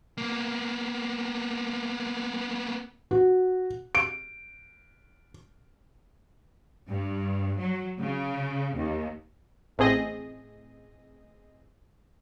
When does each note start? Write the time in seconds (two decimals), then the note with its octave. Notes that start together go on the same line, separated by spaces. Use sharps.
0.18 A#3 B3
3.11 F#4
3.95 D7
6.88 G2
7.59 F#3
8.00 C#3
8.76 D#2
9.78 A1 A2 C4 G#4 D#5